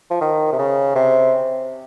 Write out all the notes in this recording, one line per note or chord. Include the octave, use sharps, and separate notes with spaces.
F3
D#3
C3
C#3
C3